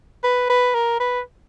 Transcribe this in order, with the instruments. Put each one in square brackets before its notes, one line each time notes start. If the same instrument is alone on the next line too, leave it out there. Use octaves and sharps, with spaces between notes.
[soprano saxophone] B4
B4
A#4
B4